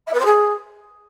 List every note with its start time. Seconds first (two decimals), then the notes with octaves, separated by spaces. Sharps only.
0.06 E5
0.13 B4
0.19 C5
0.25 G#4